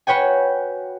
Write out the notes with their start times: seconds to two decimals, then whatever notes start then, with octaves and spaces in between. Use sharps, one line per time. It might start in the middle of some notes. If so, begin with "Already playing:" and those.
0.07 F#4 B4 C#5 G5 G#5